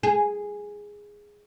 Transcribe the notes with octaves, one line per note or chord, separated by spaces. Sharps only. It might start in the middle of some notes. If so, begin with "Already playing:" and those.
G#4